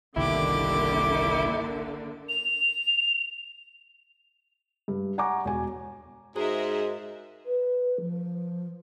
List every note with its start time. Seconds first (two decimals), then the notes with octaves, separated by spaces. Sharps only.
0.17 G1 C2 D3 D#3 A#3 E4 G4 D6
2.29 F7
4.88 G2
5.18 F#5 G#5 A#5 C#6 D6
5.45 E1 G#5
6.36 G#2 F#4 G#4 A#4 C5 D#5 E5
7.45 B4
8.00 F3